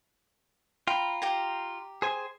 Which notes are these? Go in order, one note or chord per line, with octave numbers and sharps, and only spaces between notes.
F4 G5 A#5 B5
G4 G5 A#5
G#4 C5 G#5